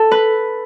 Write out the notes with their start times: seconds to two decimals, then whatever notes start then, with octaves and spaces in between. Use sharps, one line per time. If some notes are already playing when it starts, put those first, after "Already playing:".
Already playing: A4
0.11 B4